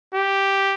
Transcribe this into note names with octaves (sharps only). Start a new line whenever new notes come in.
G4